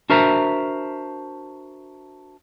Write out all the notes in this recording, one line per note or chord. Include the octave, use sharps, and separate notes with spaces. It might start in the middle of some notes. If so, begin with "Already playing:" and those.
D4 F#4 A#4 C5 E5 A#5